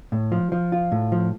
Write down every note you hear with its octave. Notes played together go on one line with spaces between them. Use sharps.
A2
F3
F3
F4
A2
F3